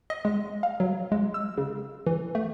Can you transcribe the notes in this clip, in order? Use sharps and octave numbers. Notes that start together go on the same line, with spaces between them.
D#5
G#3
F5
F#3
G#3
E6
C#3
E3
A3